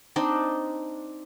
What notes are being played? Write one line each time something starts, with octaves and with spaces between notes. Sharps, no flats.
C4 D4 D#4